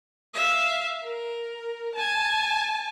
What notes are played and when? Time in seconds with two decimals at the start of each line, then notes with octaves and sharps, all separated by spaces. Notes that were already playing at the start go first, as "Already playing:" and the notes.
0.34 E5 F5
1.02 A#4
1.95 G#5 A5